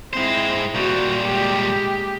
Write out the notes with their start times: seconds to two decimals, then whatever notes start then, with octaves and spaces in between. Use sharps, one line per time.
0.13 G#3 C4 E4 C5
0.74 A#2 G3 F#4
1.21 G#3 G4